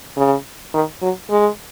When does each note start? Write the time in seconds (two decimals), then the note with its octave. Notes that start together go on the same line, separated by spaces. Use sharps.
0.16 C#3
0.74 D#3
1.02 F#3
1.30 G#3